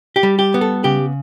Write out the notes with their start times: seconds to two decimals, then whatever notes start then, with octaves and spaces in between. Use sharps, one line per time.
0.16 G4
0.23 G3
0.39 G4
0.54 B3
0.61 A4
0.84 C#3 G4